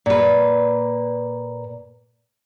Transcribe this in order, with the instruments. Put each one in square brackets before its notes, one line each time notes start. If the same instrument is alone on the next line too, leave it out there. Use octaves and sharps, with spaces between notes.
[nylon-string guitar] A#2 B4